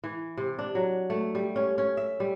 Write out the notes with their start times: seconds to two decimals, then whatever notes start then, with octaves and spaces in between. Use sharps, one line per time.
0.04 E3
0.37 C3
0.59 D4
0.75 F#3
1.10 A3
1.35 G3
1.56 C#4
1.78 C#4
1.97 E5
2.20 G3